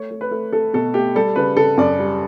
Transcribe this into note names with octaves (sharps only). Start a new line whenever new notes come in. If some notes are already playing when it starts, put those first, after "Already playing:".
Already playing: A3 C#5
A3
B4
A3
A3 A4
B2 A4
A3 G4
G3 A4
C#3 B4
C#3 A4
F#2 D5
G3